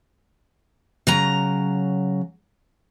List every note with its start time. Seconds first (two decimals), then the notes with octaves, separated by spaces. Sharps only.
1.07 C#3 F#3 A#5